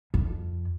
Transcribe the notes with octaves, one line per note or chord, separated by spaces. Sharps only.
F2